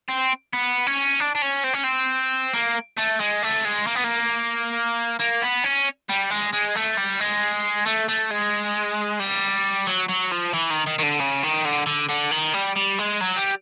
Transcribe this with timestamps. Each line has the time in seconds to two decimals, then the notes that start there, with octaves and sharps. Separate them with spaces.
0.08 C4
0.53 B3
0.87 C#4
1.20 D4
1.35 D4
1.42 C#4
1.64 C4
1.74 C#4
1.84 C4
2.54 A#3
2.97 A3
3.20 G#3
3.43 A3
3.65 G#3
3.87 A#3
3.95 B3
4.04 A#3
5.20 A#3
5.43 B3
5.64 C#4
6.09 G3
6.31 G#3
6.53 G#3
6.76 A3
6.98 G3
7.20 G#3
7.86 A3
8.09 A3
8.31 G#3
9.20 G3
9.87 F#3
10.09 F#3
10.31 F3
10.53 E3
10.70 D#3
10.87 D#3
10.99 D#3
11.03 D3
11.20 C#3
11.43 D#3
11.65 D3
11.86 D3
12.09 D3
12.32 D#3
12.54 G3
12.76 G3
12.99 G#3
13.21 F#3
13.36 G3